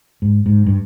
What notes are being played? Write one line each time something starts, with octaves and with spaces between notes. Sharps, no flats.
G#2
G#2
G2